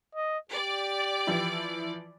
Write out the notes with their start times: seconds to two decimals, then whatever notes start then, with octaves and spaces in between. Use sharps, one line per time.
0.15 D#5
0.51 G4 D5
1.27 E3 F3 E4